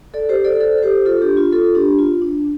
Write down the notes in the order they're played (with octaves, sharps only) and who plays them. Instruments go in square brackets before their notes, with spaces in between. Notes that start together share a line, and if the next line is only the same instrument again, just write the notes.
[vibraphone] A4 D5
G4 C5
A4 D5
C5
A4 D5
A4
G4 C5
F4 A4
D4 G4
F4
F4 A4
D4 G4
F4
D4